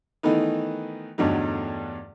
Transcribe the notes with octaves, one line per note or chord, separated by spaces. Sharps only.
D#3 E3 A3 B3 D#4
E2 G2 D3 F#3 A3 D#4